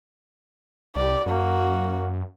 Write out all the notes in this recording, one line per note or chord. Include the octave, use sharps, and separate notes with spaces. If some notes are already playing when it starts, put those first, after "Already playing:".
C2 G4 D5
F#2 A#3 F#4